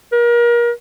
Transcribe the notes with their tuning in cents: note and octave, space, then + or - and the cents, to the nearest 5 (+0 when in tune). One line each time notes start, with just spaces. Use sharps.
A#4 +30